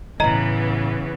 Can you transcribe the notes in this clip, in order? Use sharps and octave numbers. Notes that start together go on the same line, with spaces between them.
A2 C#3 E3 B3 E4 D#5 A#5